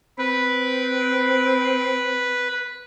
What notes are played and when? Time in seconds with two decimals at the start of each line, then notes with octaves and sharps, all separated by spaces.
0.18 C4 B4